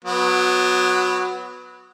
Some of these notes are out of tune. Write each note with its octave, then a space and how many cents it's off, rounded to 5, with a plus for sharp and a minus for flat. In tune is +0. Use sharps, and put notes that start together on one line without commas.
F#3 -15 B3 +0